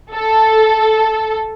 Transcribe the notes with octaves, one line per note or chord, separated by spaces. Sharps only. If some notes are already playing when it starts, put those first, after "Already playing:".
A4